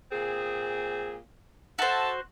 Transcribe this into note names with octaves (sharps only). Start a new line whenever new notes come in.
A#2 C4 G#4
F#4 A4 C5 E5 A5